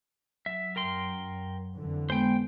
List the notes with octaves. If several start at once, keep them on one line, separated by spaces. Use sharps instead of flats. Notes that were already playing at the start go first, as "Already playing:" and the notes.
F#3 E5
F#2 A#4 G5 C6
F2 D3 E3
G#3 B3 C5 G5